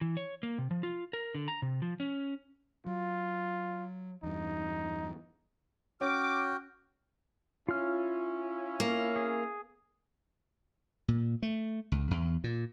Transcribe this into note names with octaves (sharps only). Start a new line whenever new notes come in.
E3
C#5
A#3
C3
F3
F4
A#4
D3
A#5
C3
F3
C#4
F#3 F4
E2 G2 D#4
C#4 F#4 G5 D6 F6
C#4 E4 F4 F6
A#3
G#4
A#2
A3
C#2
E2
A#2